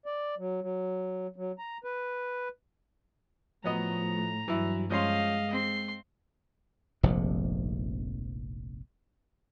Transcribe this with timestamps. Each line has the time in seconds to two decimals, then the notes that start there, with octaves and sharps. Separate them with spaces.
0.06 D5
0.38 F#3
0.62 F#3
1.36 F#3
1.59 A#5
1.84 B4
3.64 A2 F3 F#3 A3 B3 D#5 A#5
4.48 G2 E3 F#3 E4
4.90 F3 G#3 C#4 D#5 F5 C6
5.53 C4 C6
7.03 F1 A#1 G#2 C3